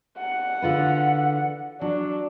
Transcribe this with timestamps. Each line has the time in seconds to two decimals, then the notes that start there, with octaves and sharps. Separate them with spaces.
0.17 F#5
0.62 D3 F4 B4
1.81 F#3 D4